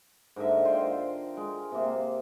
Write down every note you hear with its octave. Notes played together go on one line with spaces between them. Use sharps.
G#2 D3 A#4 E5
F4 C5 G5
G#3
C3 A#3